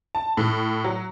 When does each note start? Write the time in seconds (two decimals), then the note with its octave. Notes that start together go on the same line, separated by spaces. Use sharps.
0.15 A5
0.37 A2
0.84 F#3